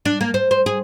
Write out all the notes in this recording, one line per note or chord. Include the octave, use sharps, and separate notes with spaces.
D4
A#3
C5
C5
G#4